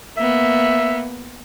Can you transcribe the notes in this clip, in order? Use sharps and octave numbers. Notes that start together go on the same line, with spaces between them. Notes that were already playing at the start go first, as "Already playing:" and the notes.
A#3 B3 E5